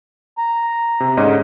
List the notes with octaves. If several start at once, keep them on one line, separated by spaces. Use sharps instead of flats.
A#5
C3
G#2 D3 C#4 D#5